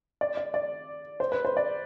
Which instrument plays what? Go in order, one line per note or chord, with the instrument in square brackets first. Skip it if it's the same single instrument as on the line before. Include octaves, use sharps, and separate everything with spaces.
[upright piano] D5
D5
D5
C5
B4
C5
D5